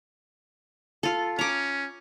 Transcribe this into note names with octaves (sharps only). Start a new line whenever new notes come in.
F4 A4
C#4 A#5 D6